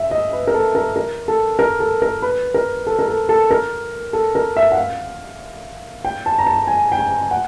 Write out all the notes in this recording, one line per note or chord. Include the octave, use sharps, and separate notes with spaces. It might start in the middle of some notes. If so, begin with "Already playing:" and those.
Already playing: E5
D#5
B4
A#4
A4
A#4
A#4
A4
A#4
A4
A#4
B4
A#4
A4
A#4
A4
A4
A#4
A4
A#4
E5
F#5
F5
G5
A5
A#5
A5
G#5
G5
G#5
F#5